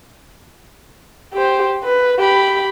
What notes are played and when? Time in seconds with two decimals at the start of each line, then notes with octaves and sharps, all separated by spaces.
1.34 G4 C5
1.84 B4
2.19 G4 B5